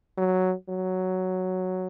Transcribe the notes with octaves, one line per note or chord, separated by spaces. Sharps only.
F#3
F#3